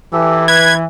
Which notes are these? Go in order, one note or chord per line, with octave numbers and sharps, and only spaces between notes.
E3 G4 A4
B4 B5 G#6